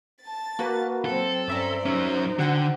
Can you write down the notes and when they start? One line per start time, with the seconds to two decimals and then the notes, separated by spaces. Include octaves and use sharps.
0.22 A5 A6
0.59 A#3 F#4 B4
1.05 F#3 C4 A4
1.48 G2 C#4 C5 D5 E5 A#5
1.86 F#3 C#4 D#4 C5
2.39 D3 F#4 F#5 G5